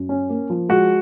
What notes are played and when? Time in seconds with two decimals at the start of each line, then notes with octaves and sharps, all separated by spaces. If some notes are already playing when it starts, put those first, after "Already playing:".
Already playing: F#2
0.09 C#4
0.29 A#3
0.50 F3
0.69 G#3 F#4